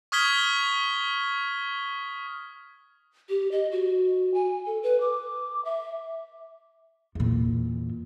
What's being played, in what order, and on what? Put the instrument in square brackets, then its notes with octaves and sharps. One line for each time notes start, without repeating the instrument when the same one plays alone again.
[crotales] C#6 D#6 F6 G#6 B6 G7
[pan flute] G4
D#5
F#4
G#5
A4
B4
D6
E5
[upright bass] E2 A#2